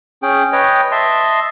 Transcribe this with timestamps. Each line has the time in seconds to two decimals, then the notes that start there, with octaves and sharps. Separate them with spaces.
0.23 C#4 G#4 G5
0.53 B4 C#5 D#5 G5
0.92 D#5 E5 A5 C6